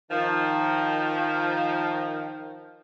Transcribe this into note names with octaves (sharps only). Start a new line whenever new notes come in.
D#3 F3